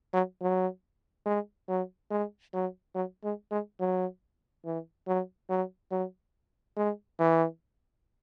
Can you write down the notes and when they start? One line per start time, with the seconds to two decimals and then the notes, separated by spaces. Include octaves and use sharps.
0.13 F#3
0.42 F#3
1.26 G#3
1.69 F#3
2.11 G#3
2.53 F#3
2.95 F#3
3.24 G#3
3.51 G#3
3.80 F#3
4.65 E3
5.07 F#3
5.49 F#3
5.91 F#3
6.77 G#3
7.20 E3